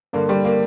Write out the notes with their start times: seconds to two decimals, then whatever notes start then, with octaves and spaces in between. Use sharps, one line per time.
0.13 G2 D3 A#3
0.29 G3
0.45 A#3